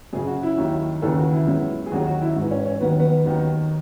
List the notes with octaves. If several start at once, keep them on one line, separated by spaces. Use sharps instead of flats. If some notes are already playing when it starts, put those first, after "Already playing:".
F#2 C#3 F#3 G#4
F#4
E4
D#2 D#3 F#3
D#2 C#3 E3 A4
F#4
E4
C#2 B2 F#3
G#4
D#2 D#3 F#3 F#4
F#4
E4
G#2 E3
C#4
C#4
D#2 D#3 F#3 B3
B3
D#2 D#3 F#3